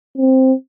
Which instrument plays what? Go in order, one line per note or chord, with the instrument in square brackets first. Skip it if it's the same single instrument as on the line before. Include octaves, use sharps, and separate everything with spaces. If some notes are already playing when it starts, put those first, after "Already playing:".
[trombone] C4